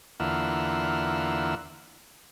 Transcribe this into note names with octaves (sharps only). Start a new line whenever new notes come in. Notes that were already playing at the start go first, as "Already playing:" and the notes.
E2 D3 A#3 F4 E5 F#5